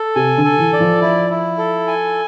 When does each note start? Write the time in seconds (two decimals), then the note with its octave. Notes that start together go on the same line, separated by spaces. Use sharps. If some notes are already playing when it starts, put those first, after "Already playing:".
Already playing: A4
0.15 C3 G#5
0.38 D3
0.44 A4
0.58 E3
0.73 D5
0.80 F3
1.01 E4
1.30 E4
1.58 A4
1.87 G#5